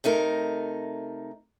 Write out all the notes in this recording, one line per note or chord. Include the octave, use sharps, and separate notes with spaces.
C3 A3 D#4 A#4